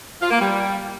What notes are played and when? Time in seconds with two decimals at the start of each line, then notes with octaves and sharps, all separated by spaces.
0.21 F4
0.31 A#3
0.40 G3